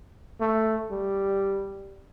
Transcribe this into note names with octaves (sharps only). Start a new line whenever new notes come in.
A3
G3